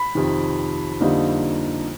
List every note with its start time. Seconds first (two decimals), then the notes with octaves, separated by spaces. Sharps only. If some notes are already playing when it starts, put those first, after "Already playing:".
Already playing: B5
0.15 F2 C3 D#3
1.01 F2 D3 G3 A#3 D#4